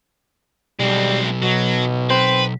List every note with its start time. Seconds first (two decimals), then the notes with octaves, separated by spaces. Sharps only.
0.80 B1 G3 G#3 C4
1.42 B2 F#3
2.10 C4 B4